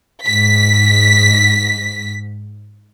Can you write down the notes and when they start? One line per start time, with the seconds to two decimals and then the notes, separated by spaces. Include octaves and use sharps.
0.25 G#2 B6